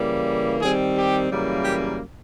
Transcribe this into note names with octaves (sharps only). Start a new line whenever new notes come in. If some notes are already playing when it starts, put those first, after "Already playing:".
Already playing: C#3 E3 G3 A#3
D#3 G3 C4 G#4
G4
F#2 C#3 E3 G3 A#3
G4